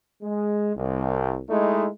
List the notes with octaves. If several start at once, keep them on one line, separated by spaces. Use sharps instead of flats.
G#3
C2
G#3 A3 D#4 E4